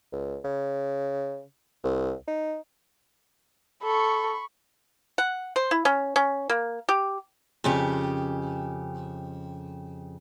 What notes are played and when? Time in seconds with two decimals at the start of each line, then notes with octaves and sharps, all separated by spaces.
0.13 C#2
0.45 C#3
1.84 C2
2.27 D#4
3.83 A4 B5 C#6
5.18 F#5
5.56 C5
5.71 E4
5.85 C#4
6.16 C#4
6.49 A#3
6.89 G4
7.64 F2 C#3 G4